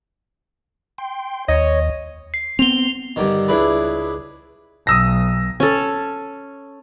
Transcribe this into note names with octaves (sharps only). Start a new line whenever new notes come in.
G5 C6
D#2 C#5 D#5
C7
B3 C4 F7 G7
G2 D3 D#3
C#2 D4 E4 G#4 B4
B1 D#6 E6 A#6
C#4 A4